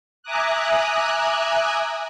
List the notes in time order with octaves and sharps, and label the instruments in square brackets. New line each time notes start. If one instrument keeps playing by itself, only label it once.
[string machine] E5 G#5 A#5 D6 D#6 F#6